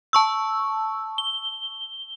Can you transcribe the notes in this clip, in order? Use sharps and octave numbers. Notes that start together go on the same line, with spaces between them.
A5 C#6 E6
G7